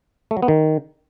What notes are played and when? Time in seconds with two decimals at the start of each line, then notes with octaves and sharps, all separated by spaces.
0.31 A3
0.37 F#3
0.42 B3
0.48 D#3